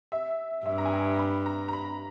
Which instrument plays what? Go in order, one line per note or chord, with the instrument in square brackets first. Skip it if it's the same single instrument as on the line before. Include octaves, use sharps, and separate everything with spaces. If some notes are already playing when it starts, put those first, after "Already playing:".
[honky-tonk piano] E5
[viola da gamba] G2 [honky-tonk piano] E5
[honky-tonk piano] A#5
G#5
G5
B5
A#5
A#5
B5